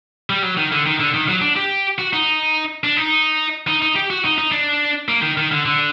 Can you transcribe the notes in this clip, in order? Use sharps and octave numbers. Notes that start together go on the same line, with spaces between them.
G3
F#3
D#3
D3
D#3
D3
D#3
F#3
D4
G4
F#4
D#4
D4
D#4
D#4
D#4
G4
F#4
D#4
D#4
D4
A#3
D#3
D#3
D3
D3